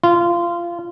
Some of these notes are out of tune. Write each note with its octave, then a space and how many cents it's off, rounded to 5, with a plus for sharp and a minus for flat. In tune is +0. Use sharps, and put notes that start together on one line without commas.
F4 -20